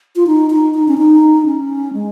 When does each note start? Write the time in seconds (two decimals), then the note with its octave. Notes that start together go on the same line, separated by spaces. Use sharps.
0.16 F4
0.27 D#4
0.50 D#4
0.75 D#4
0.88 C#4
0.98 D#4
1.46 C#4
1.93 G#3